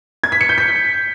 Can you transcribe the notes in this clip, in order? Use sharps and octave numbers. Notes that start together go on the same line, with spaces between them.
G#6
B6
C#7
G6
B6